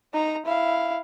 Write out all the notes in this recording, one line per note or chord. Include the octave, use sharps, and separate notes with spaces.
D#4 A#5
E4 F5